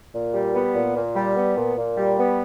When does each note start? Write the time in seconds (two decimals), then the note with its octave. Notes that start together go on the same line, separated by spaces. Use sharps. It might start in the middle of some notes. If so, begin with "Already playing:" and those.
0.14 A#2
0.34 G3
0.54 B3
0.74 A#2
0.95 A#2
1.15 G3
1.36 B3
1.57 A#2
1.77 A#2
1.97 G3
2.18 B3